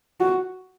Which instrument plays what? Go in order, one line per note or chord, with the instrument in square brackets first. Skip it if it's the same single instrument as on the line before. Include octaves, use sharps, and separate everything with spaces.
[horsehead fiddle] F#4